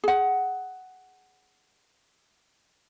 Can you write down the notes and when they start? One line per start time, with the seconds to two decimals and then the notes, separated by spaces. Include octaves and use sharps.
0.04 G#4 F#5